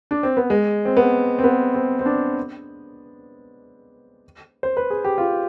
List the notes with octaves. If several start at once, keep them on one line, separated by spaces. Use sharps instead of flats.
D4
C4
B3
G#3
C4
B3
C4
B3
C4
C4
D4
C5
B4
G#4
G4
F4